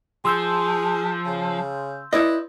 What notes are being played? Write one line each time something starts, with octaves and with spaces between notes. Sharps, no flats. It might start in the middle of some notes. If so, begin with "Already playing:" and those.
F3 G#4 C6 E6 G6
C#3
E4 B4 D5 D#5